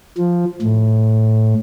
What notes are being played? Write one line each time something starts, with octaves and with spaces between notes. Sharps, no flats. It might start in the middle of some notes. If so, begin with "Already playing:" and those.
F3
A2